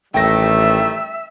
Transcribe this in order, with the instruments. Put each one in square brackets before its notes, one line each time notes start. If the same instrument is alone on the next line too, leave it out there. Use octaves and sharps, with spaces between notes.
[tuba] A1 [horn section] D#3 G3 A3 [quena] E5 [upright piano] G5 A#6